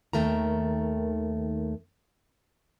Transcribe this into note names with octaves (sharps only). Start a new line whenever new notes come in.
D#2 D#3 A3 A#4 A#5